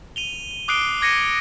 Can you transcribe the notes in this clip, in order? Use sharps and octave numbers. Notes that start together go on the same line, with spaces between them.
D#7 F7 G7
D6 D#6 F#6 C7 D7 G7
D6 G#6 A#6 C#7 D#7